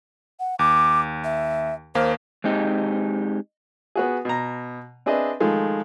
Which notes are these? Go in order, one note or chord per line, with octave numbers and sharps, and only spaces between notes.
F#5
D#2 D6
E5
D#2 A#3 C5 F5
G#3 C4 D#4 G4
B3 F#4 G#4
B2 A#5
C4 D4 G#4 B4 D#5 E5
D#3 F3 G#3 A3